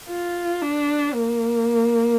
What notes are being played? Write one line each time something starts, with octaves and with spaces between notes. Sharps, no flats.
F4
D4
A#3